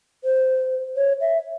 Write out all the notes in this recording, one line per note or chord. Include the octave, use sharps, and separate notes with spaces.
C5
C#5
E5